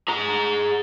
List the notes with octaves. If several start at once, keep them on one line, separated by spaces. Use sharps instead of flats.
G#4 A#5